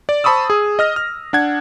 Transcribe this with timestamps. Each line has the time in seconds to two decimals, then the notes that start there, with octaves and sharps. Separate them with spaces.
0.09 D5
0.24 C5 A5 B5 C#6 D#6 E6
0.50 G#4
0.79 D#5 F6 A#6
0.96 F6
1.33 D4 F#5 G#6